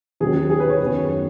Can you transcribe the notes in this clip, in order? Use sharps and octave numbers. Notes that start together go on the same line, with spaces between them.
D#2 D#3 F#3 C#4 G#4
G#4
B4
C#5
F#2 D#3 B3